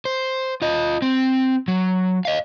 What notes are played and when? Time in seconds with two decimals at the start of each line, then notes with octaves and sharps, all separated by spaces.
0.05 C5
0.62 F4 D#5
1.02 C4
1.68 F#3
2.25 D#5 F5